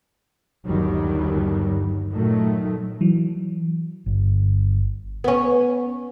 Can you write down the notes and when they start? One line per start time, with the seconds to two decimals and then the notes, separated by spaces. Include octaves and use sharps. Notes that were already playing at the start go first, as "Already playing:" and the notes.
0.66 G1 D#2 D#3 F#3 G3
2.12 A#2 D#3 F#3 A3
3.01 E3 F#3
4.06 G1
5.24 B3 C#4